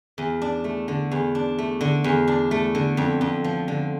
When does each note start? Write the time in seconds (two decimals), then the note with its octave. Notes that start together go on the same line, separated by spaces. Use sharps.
0.18 E2
0.42 D4
0.64 A3
0.88 D3
1.11 E2
1.35 D4
1.58 A3
1.81 D3
2.04 E2
2.28 D4
2.51 A3
2.75 D3
2.97 F2
3.21 F2
3.44 F3
3.68 D3